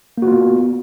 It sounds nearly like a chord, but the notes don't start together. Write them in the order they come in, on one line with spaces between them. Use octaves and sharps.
A#3 F#4 F4 B3